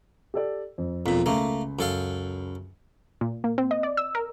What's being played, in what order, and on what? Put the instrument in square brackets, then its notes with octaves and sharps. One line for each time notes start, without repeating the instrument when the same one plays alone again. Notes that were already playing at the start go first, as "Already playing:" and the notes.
[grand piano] G4 A4 D5
F2
[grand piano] E1 B6 [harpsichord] F2 A#2
[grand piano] C#2 [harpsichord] A3 A#3
[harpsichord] F#2 A4 F5
[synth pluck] A#2
A#3
C4
D#5
D5
E6
A#4